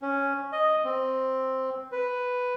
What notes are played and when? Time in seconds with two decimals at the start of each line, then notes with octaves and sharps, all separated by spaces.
0.02 C#4
0.52 D#5
0.85 C4
1.92 B4